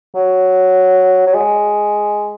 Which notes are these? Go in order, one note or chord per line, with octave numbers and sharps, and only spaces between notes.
F#3
F#3
G#3